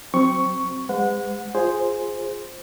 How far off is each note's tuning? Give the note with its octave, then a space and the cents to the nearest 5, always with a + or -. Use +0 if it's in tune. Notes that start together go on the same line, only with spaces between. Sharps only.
F#3 +0 C4 +0 C#6 +5
G#3 -35 B4 +45 F#5 -30
F4 +5 G#4 +0 C5 +0